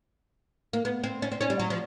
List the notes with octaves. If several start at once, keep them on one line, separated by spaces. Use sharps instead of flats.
A#3
B3
C4
C#4
C4
C#4
G3
F#3
F3